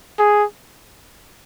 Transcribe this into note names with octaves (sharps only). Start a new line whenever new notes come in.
G#4